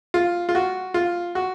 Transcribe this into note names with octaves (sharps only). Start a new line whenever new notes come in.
F4
F4
F#4
F4
F#4